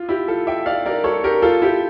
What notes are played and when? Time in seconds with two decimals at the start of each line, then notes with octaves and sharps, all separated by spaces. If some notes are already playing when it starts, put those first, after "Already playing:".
Already playing: F4
0.09 E4 G4
0.28 F4 A4
0.47 E5 G5
0.66 D5 F5
0.86 A#4 D5
1.04 A4 C#5
1.24 G4 A#4
1.42 F4 A4
1.62 E4 G4